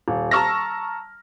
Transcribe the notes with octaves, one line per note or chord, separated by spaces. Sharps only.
D#1
A5 A#5 C#6 E6 F6 A#6